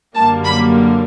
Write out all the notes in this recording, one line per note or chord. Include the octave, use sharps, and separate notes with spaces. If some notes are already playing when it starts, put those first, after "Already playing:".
F#2 D3 G3 A#3 A5
B5